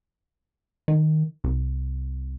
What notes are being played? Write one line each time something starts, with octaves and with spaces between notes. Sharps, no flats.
D#3
C2